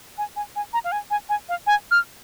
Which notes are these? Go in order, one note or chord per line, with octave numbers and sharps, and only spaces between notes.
G#5
G#5
G#5
A#5
F5
G#5
G#5
G#5
F5
G#5
F6